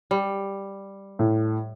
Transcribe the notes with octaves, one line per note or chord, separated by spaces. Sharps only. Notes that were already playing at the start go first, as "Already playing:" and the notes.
G3
A2